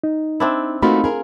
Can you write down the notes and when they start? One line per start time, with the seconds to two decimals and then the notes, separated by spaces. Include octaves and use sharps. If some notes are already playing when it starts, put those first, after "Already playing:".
0.04 D#4
0.40 C4 D4 E4
0.82 A3 A#3 C4 D#4 F4 F#4 B5
1.04 G#4 A#4